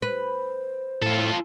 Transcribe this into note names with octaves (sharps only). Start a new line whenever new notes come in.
B4 C5
A2 F4 A4